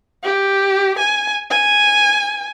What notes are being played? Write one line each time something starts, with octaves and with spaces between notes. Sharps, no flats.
G4
G#5
G#5